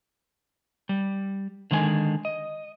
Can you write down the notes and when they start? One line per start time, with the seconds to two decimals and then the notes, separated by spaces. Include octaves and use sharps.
0.89 G3
1.71 D3 D#3 G#3 D#5 G#5
2.25 D#5